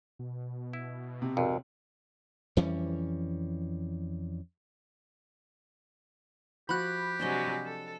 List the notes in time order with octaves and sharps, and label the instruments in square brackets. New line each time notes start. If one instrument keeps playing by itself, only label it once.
[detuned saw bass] B2
[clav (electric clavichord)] E4
[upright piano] C3
[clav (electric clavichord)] G#1 F2
[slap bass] F2 E3 G3 C#4
[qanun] F3 F#4 [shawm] G4 [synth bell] B5 F#6
[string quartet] C3 F#3 G#3 [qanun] D4 C5 D#5
[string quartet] A4